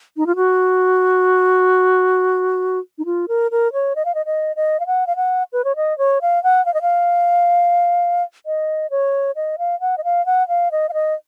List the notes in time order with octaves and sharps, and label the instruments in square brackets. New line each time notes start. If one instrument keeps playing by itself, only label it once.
[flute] D#4
F4
F#4
D#4
F4
A#4
A#4
C#5
D#5
F5
D#5
D#5
D#5
F5
F#5
F5
F#5
B4
C#5
D#5
C#5
F5
F#5
F5
D#5
F5
D#5
C#5
D#5
F5
F#5
D#5
F5
F#5
F5
D#5
F5
D#5